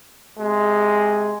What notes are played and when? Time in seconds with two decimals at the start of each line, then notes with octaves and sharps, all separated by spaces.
0.39 C3 G#3